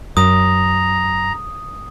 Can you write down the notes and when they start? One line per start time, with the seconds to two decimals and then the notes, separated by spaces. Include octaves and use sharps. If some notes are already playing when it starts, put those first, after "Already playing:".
0.17 F#2 A#5 D#6